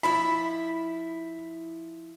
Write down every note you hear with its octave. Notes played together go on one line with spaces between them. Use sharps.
F3 E4 E5 B5